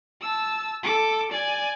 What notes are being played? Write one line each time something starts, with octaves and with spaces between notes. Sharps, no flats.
A5 E6
A4 D6
D5 G#5